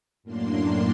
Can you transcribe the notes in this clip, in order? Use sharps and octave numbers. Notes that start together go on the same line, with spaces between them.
F#2 A2 A#3 D4 C6